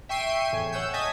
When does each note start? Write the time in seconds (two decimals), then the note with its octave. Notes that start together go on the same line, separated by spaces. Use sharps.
0.09 E5 G5 C#6 C7 D#7
0.52 E2 A2 G#5
0.72 C#5 F#5 E6 G6
0.93 D#5 G#5 A5 D#6 G#6 B6